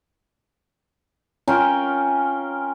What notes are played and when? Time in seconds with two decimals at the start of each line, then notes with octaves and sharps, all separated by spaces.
1.48 C#4 F4 A#4 G5